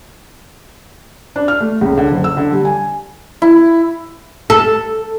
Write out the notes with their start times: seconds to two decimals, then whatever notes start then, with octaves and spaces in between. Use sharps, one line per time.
1.36 D4
1.48 F6
1.60 A3
1.81 C#2
1.98 D3
2.11 F#1
2.24 E6
2.37 D3
2.52 G3
2.65 G#5
3.42 E4
4.50 A4